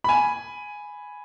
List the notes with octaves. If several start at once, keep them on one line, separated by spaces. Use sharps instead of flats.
G#5 B5